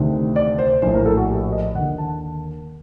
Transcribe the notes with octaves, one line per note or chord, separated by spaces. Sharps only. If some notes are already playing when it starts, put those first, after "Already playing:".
Already playing: D2 C3 D#3
D5
C5
A#1 A2 C5
A#4
A4
F#4
G4
D#5
D#2 D3 F#5
A5